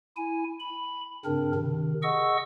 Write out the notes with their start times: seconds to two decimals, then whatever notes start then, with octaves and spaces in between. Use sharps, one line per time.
0.17 E4 G#5
0.60 B5
1.25 G2 C#3 C4 D4 A#4
1.55 C3 D#3
2.03 G#4 D#5 F#5 C#6 E6